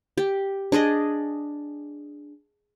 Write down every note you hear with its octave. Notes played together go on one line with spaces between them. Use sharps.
G4
D4 G#4 D5 D#5